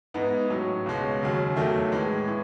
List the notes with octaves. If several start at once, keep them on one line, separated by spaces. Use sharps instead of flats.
G#2 E3 B3 D#4
A2 F#3 C#4
C#2 B2 G#3 C#4
D#2 C#3 F#3
E2 D#3 F#3 A3 E4
A2 E3 G#3
A2 E3